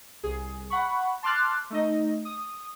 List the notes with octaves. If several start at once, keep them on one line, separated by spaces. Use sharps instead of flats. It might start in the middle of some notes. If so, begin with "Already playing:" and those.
C2 G#4
F#5 B5 C#6
A5 C6 D6 F6 F#6 A6
A3 D#4 D#5
D#6